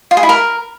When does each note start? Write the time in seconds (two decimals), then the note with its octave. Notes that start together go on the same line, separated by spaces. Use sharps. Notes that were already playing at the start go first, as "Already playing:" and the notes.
0.11 F4
0.17 G#4
0.23 E4
0.29 A#4